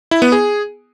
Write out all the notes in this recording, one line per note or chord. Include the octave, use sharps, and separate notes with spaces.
E4
B3
G#4